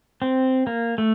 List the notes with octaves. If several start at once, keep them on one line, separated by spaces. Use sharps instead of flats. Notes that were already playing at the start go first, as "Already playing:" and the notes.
C4
A#3
A3